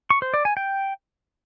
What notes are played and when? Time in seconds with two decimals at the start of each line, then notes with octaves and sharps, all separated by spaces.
0.10 C#6
0.22 C5
0.34 D5
0.45 G#5
0.57 G5